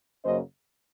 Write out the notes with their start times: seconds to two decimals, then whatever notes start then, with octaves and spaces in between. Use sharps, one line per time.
0.24 F#2 C#3 F#3 A#3 C#4 C5 D#5